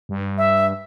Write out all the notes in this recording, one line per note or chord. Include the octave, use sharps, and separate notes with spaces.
G2
E5